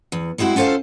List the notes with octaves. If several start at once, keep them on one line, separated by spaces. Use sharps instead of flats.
E2
G3 G#3 C4 E4 F#4
C#4 F4 A4 C5 F5